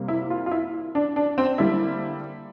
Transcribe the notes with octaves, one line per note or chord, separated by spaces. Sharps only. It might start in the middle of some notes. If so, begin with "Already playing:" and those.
Already playing: C3 G3 A#3
E4
F4
F4
E4
D4
D4
C4
D3 G3 A#3 E4